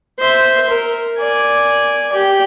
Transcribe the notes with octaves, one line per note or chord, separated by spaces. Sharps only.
C5 E5
A#4
D5 G#5
G4 D5